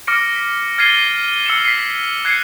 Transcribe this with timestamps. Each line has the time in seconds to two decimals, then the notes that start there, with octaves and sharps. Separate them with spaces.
0.07 D6 F6 A#6 C#7 D7
0.36 B6
0.78 F6 G#6 A6 C7 D#7 G7
1.46 E6 C#7 D#7 E7
1.65 B6 C7
2.25 F#6 G#6 C7 C#7 D#7